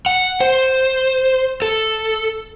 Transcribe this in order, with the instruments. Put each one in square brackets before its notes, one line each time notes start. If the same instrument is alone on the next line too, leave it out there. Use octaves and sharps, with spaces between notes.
[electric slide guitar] F#5
C5
A4